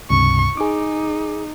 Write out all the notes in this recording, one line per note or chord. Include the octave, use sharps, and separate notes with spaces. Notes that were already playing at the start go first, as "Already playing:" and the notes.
C#2 G2 C3 C#6
D#4 G#4 D6